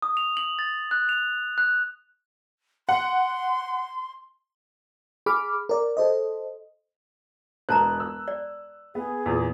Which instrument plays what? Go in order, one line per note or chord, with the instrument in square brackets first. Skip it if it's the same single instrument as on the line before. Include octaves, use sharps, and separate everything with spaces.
[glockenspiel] D#6
F7
F#7
A6
F#6
F7
F#6
[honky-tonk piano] F#5 [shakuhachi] C6
[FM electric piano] G#4 B5 D6 F6
A#4 D5
A4 C5 D#5
[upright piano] E1 F#6 [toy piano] B4 A5 A#5
[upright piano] E6
[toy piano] D5
[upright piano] B3 [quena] G#4
[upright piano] E2 A#2